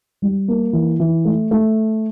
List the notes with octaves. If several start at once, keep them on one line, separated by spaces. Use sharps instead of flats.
G3
A#3
E3
E3
A3
A3